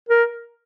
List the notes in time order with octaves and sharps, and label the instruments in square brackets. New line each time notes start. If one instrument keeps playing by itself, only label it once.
[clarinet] A#4